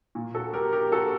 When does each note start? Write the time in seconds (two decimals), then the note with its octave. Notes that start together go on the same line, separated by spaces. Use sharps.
0.15 A#2
0.34 F#4 A4
0.53 G4 A#4
0.73 G4 A#4
0.92 F#4 A4